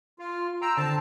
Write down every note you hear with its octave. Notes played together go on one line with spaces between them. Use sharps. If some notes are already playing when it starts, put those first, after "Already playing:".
F4
G5 A#5 C6 E6
D3 C4 A5